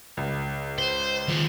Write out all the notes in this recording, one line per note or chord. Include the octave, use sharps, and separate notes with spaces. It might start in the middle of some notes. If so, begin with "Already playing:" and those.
C#2
C5
D#3 F4